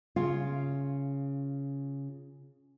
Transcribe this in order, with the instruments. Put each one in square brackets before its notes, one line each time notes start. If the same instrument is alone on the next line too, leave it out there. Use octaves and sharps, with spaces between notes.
[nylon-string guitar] C#3 F4